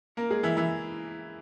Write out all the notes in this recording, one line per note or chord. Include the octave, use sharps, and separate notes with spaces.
A#3 A#4
G#3 G#4
E3 E4
E3 E4